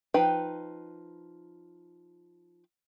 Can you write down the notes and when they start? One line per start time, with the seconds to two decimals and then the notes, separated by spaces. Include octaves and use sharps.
0.14 F3 D#4 B4 G5